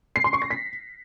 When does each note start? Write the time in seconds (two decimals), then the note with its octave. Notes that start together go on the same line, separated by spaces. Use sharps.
0.16 C7
0.24 C6
0.33 C#6
0.42 A#6
0.50 B6